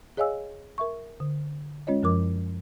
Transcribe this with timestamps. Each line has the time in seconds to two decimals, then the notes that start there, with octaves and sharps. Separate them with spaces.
0.17 G#4 C#5 D#5 F5 G#5 E6
0.78 A#4 E5 C#6
1.20 D3
1.87 G#3 C#4 F4 C#5 D#5
2.03 F#2 F3 A#4 D6